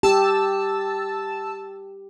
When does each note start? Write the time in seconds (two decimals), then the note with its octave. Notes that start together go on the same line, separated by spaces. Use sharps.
0.03 G4 A5 E6